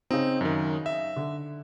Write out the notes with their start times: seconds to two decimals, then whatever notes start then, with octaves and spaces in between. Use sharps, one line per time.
0.11 C#3 C4 D#4
0.41 F#2 D#3
0.86 E5
1.16 D3